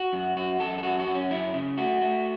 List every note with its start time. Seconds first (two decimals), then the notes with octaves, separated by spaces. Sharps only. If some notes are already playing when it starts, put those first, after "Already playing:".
Already playing: F#4
0.13 F#2
0.37 F#2 F#4
0.60 F#2 A4
0.78 A4
0.83 F#2 F#4
0.99 F#4
1.07 F#2
1.15 C#4
1.31 F#2 E4
1.54 C#3
1.78 A3 F#4
2.01 A3